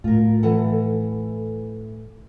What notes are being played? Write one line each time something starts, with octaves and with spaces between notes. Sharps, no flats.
A2 F4 A#4
E3 A4 F#5